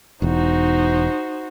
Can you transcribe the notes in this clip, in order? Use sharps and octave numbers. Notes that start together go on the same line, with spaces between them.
E1 E2 D#4 F#4 C5